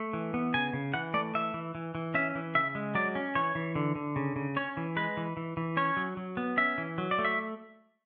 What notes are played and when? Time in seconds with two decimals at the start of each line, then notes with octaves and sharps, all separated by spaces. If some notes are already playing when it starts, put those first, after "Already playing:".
Already playing: A3
0.13 E3
0.34 B3
0.54 C#3 G#5
0.73 C#3
0.94 E3 F#5
1.14 A3 D5
1.35 E3 E5
1.54 E3
1.75 E3
1.95 E3
2.14 C#4 E5
2.35 E3
2.55 C#3 E5
2.75 G#3
2.95 F#3 D5
3.15 C#4
3.35 E3 C#5
3.55 E3
3.75 D3
3.95 D3
4.16 C#3
4.36 C#3
4.56 C#4 C#5
4.77 E3
4.96 G#3 B4
5.17 E3
5.37 E3
5.57 E3
5.77 C#4 C#5
5.97 F#3
6.17 F#3
6.37 B3
6.57 C#4 E5
6.78 E3
6.98 F#3
7.11 D5
7.19 A3
7.25 E5